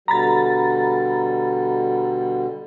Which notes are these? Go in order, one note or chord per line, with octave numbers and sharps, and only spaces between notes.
B2 D3 G3 A#5 B5 A6